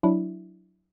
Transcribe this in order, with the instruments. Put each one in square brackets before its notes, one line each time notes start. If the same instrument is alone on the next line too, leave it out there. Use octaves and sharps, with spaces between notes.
[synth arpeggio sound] F#3 D4 E4